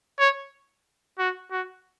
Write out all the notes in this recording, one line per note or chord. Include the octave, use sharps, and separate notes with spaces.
C#5
F#4
F#4